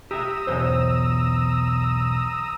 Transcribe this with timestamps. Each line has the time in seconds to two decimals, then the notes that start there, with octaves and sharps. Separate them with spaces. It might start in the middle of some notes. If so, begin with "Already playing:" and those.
0.11 G4 E5 A#5 D#6 E6
0.47 B1 E2 C5